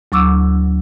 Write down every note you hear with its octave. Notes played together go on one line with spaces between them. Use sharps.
D2 F#3 C#6 D6 E6